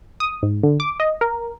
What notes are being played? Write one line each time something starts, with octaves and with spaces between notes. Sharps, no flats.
D#6
G#2
D3
D6
D#5
A#4